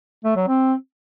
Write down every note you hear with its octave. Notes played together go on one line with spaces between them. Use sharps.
A3
F#3
C4